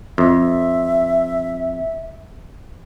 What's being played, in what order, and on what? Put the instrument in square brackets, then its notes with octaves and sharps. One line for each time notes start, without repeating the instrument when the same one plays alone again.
[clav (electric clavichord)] F2 [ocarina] E5